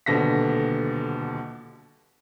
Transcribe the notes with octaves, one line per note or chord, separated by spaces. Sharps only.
D#1 B2 D3 A#6 B6